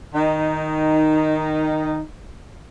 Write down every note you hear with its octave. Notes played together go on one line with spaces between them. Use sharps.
D#3 D#4